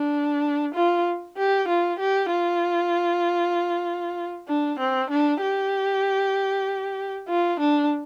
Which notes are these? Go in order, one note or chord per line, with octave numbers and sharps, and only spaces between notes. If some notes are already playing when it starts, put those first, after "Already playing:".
Already playing: D4
F4
G4
F4
G4
F4
D4
C4
D4
G4
F4
D4